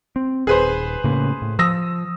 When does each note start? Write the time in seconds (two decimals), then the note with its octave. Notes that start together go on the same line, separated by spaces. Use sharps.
0.16 C4
0.47 D#1 G#4 B4 C5
1.04 A2 C#3 A#3
1.42 A2
1.59 F3 D#6 E6 A#6